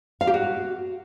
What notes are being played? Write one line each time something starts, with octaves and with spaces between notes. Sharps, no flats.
F5
G4
F#4